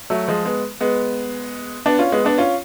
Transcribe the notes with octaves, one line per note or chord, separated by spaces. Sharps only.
F#3 A3
F3 G#3
G#3 B3
G#3 B3
B3 D4
C#4 F4
G#3 B3
B3 D4
C#4 F4